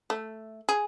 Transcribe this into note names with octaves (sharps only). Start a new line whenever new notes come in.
A3
G#4